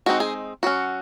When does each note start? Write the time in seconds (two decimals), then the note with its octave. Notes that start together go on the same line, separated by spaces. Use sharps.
0.06 G#3 C4 D#4 F#4
0.20 G#4
0.63 F#3 C#4 F#4